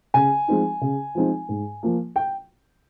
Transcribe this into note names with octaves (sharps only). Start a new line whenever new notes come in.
C#3 G#5
F3 G#3 C4 D#4
C#3
F3 G#3 C4 D#4
G#2
F3 A#3
G5